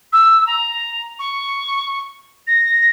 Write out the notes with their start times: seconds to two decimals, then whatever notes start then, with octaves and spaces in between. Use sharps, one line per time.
0.12 E6
0.46 A#5
1.19 C#6
2.47 A#6